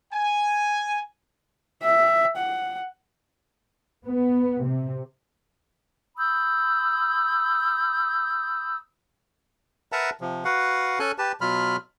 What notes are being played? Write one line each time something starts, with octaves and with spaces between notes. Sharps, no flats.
G#5
E5
F#5
B3
C3
B5 D#6 E6 G6
A#4 B4 E5 F#5 A5 A#5
C3 F3
F#4 B4 F5 F#5
C#4 A4 G#5 F#6
G4 B4 A5
B2 F#3 F4 B5 F6